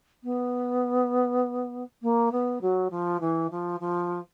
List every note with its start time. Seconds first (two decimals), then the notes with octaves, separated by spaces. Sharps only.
0.23 B3
2.02 A#3
2.32 B3
2.61 F#3
2.90 F3
3.20 E3
3.50 F3
3.80 F3